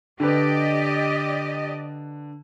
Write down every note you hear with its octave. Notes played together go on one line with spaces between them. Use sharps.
D3 G4 B4 D5 D#5